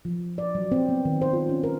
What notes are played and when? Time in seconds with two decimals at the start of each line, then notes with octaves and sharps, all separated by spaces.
0.05 F3
0.38 D5
0.55 F#3
0.72 C4
0.89 B3
1.05 D#3
1.22 C5
1.33 F4
1.49 C#4
1.64 A#4